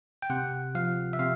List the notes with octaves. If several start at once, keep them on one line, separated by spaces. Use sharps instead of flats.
G5
C3 F#5
F3 F5
E5
C3 F5